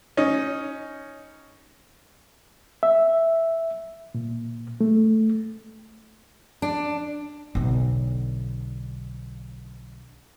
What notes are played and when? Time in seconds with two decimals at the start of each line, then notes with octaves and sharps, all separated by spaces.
0.17 C#4 D#4
2.83 E5
4.15 A#2
4.81 A3
6.62 D4
7.55 B1 D3